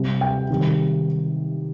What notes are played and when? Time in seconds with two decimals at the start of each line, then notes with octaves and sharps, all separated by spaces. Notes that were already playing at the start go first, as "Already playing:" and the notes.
Already playing: C3 G3
0.21 G5
0.50 C3 D#3 G3